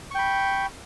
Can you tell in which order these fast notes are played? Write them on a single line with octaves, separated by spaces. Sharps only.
C#6 G5 B5